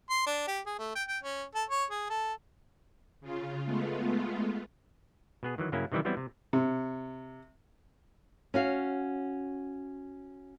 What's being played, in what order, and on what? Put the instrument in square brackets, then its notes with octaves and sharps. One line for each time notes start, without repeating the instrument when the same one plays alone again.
[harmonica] C6
D4
G4
G#4
A3
G5
G5
C#4
A4
C#5
G#4
A4
[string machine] C#3 F4
G#3 A3 B3 F4
[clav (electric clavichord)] B2 B3 G#4
D#3 E3 F#3
G2 C#3 F#3 A#3 C#4 E4
C3 D#3 E3 G3 E4
E3 F#3 G3 B3 C4 E4
C3
[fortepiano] C3
[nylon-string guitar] C#4 F#4 F5